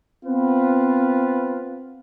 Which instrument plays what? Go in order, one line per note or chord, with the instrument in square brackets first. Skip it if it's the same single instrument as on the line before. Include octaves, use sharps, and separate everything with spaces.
[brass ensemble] B3 C4 F4 B4